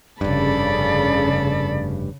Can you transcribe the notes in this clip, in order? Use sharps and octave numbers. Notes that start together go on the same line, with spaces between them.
F1 G2 C#3 A4 D5 B5